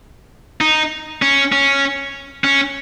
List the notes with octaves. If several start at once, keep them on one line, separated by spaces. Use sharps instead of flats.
D#4
C#4
C#4
C#4